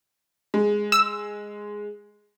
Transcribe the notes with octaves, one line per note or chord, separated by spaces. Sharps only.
G#3
E6